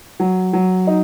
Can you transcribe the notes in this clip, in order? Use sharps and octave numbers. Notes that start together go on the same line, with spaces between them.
F#3
F#3
D#4